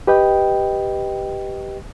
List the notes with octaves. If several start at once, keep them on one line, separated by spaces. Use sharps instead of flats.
G4 B4 D#5 G5